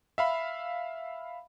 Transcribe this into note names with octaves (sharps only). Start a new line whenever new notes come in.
E5 F5 B5